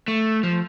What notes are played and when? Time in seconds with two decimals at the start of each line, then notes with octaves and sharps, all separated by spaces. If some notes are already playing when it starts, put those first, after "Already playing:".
0.08 A3
0.43 F3